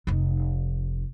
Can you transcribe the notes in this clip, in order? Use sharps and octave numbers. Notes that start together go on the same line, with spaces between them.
F1 D#4